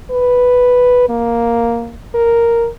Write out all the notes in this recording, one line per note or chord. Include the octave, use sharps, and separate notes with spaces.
B4
A#3
A#4